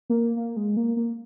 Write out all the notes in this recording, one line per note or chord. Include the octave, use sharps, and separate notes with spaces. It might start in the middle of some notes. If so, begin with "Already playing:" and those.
A#3
A#3
G#3
A#3
A#3